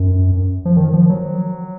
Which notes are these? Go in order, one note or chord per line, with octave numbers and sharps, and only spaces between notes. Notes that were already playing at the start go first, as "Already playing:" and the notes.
Already playing: F#2
F3
D#3
F3
F#3